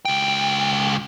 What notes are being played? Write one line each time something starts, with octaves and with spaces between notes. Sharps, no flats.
C#2 G5